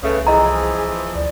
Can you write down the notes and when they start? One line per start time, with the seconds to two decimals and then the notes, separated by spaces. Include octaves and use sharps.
0.03 C2 C#3 A3 B4
0.27 E3 F3 G#4 D#5 A#5
1.15 D2 D5